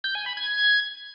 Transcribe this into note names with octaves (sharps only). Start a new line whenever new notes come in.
G6
G#5
B5
G#6